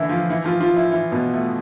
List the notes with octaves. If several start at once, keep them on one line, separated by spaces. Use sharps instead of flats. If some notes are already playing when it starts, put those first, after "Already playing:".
Already playing: D3 E3 D4 E4
F3 F4
E3 E4
F3 F4
F3 F4
E3 E4
E3 E4
B2 B3
A3